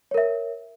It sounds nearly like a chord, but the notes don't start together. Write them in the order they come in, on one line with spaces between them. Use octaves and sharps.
C#5 A#4 E5